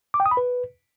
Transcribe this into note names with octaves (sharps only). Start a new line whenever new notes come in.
D6
G5
D#6
B5
B4